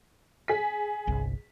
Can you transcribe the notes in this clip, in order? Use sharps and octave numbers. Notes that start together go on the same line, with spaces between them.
G#4 B6
G1 C2